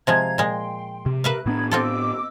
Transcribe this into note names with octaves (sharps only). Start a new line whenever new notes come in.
C3 F3 G#3 F5 A#5 G#6
A#2 G#3 G5 C6
C3
A#4 B4 E5 F5 F#6
A2 B3 D4 D#4 B5 G#6
C4 F4 A4 D#5 D6 E6